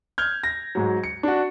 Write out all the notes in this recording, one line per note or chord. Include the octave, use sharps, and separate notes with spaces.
F6 G6 G#6
A#6
G#2 F#3
C#7
D4 F#4